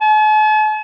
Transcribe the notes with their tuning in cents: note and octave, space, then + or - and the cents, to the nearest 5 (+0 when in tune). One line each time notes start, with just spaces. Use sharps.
A5 -45